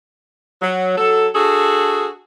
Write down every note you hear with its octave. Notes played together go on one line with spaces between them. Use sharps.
F#3
F#3 A4
D4 F#4 G#4 A4